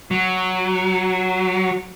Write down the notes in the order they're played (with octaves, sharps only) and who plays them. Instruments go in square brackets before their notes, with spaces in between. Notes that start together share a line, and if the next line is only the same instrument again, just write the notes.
[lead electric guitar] F#3